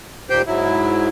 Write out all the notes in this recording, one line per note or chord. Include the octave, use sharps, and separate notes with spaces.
D#2 A#2 G4 C5 G5
G#2 F#3 E4